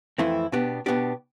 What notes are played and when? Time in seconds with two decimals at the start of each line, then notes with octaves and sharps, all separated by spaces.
0.18 F2 E3 A3 C4 E4
0.52 B2 B3 D4 G4
0.86 B2 B3 D4 G4